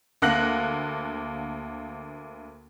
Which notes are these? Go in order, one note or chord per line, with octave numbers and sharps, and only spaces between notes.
D2 A#3 F#5 F#6 A#6 F#7